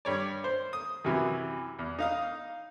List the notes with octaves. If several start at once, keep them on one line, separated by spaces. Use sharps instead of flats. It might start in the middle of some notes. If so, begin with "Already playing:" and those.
G2 C#5 D5
C5
D#6
F#2 C3 E3 F#3
E2
D#4 F5 D#6